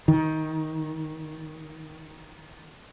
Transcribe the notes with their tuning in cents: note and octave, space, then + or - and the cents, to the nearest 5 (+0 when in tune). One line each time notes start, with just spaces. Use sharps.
D#3 +15